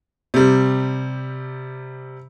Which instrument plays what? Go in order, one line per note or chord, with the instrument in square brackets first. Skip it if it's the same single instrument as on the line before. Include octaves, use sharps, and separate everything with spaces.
[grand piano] C3 G3